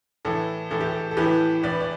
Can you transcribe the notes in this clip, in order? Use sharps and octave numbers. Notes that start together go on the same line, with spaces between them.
A2 E3 A4
A2 E3 A4
G4
A4
A4
A2 E3 G4 B4
A2 E3 B4 D5
D5